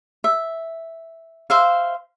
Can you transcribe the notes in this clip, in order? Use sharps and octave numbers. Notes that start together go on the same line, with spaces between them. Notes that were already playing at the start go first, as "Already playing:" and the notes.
E5
C5 E5 F5